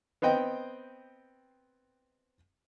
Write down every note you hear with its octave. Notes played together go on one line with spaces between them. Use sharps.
B3 C4 D#5 G5